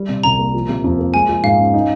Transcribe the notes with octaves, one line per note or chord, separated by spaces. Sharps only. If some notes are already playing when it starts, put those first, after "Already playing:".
Already playing: G3
C3
C2 A#5
A#3
F3
C3
F2
A#3
G#3 G#5
F3
G#2 F5
C#4
D#4